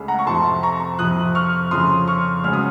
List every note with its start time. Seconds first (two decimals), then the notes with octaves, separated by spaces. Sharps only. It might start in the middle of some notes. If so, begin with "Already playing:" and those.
Already playing: C#2 C#3 A3
0.08 F#5 A#5
0.19 C#6
0.26 F2 C3 F3 A5 C6
0.63 A#5 C#6
0.99 F2 C3 F3 D#6 F#6
1.35 C#6 F6
1.71 F2 C#3 F3 C6 D#6
2.07 C#6 F6
2.44 C#2 C#3 F#3 F6
2.53 D#6